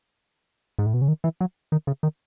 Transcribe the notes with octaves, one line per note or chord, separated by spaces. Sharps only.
G#2
A2
B2
C#3
D#3
E3
F#3
D#3
C#3
D#3